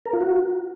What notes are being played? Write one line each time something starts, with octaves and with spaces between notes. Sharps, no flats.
A#4
F4
F#4